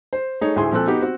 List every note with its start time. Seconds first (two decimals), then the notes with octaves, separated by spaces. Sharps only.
0.13 C5
0.41 A3 D#4 G#4 C#5
0.56 D2 A2 E4 G#4 G#5 C6
0.72 A#2 F3 C4 F4 A4 F#6
0.87 B3 D#4 F#4 G4
1.01 C4 F#4